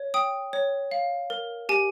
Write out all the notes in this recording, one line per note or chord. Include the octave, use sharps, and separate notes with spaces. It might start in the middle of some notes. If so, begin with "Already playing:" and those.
Already playing: C#5
G5 D#6
C#5
F5
A#4
G4 G#5